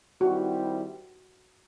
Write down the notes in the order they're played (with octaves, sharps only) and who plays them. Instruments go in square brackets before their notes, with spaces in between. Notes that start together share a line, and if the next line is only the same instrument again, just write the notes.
[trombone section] D#3 G3 C4 E4 G4 [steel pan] F#4